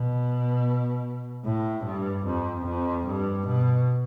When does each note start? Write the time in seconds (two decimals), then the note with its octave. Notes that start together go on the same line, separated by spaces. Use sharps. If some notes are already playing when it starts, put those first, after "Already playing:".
Already playing: B2
1.45 A2
1.85 G2
2.26 F2
2.66 F2
3.07 G2
3.47 B2